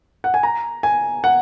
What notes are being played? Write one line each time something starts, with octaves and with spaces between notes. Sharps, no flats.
F#5
G#5
A#5
G#5
F#5